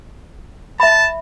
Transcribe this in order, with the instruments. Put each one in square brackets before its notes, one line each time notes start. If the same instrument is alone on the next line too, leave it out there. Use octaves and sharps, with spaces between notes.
[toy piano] E5 B5 [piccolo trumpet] A5